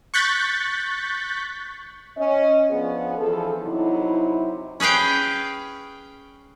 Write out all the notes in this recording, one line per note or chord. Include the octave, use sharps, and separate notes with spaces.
C#6 F#6 G6 A6 B6
C#4 D#5
F3 B3 D4 F4 G#4
E2 F3 A4
C3 F#3 D#4 E4
C#4 G#4 B4 F5 G5